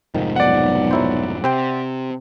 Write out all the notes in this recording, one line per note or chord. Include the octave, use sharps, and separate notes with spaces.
F1 G#2 D#3 F3
B1 D5 F#5
F#3 E4 C5
C3 C4 C5 G5